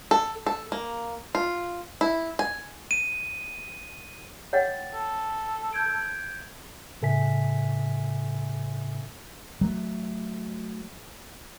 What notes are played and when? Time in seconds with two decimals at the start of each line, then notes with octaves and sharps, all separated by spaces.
0.11 A4
0.46 A4
0.72 A#3
1.35 F4
2.01 E4
2.39 G#5
2.91 D#7
4.53 C#5 F#5 G5 A6
4.94 A4
5.73 G6 G#6 D7
7.02 A2 C#3 A4 E5 G#5 B6
9.61 F#3 A3